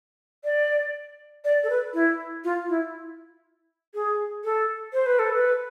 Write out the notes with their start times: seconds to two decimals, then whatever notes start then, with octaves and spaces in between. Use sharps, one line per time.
0.44 D5
1.45 D5
1.64 A4
1.70 B4
1.94 E4
2.44 F4
2.69 E4
3.94 G#4
4.44 A4
4.93 C5
5.06 B4
5.19 A4
5.33 B4